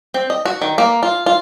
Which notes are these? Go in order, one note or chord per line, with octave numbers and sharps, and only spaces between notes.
C4
D#5
F#4
D#3
A#3
F4
F4